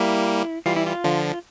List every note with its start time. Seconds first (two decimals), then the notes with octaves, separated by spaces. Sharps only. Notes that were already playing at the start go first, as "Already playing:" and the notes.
Already playing: G3 A#3 E4
0.66 E3 G3 F4
0.76 E4
0.87 F4
1.04 D3 F3